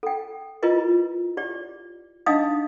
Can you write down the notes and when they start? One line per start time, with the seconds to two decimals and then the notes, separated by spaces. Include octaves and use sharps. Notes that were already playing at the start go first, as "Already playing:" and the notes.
0.03 A4 G5
0.63 E4 F4 A#4 B4 D#5
1.37 G4 D5
2.26 D4 D#4 D#5 F5 D#6